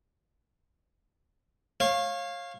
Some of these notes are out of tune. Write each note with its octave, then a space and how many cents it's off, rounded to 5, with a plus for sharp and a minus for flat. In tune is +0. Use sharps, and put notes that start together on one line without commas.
C#5 -25 F5 +0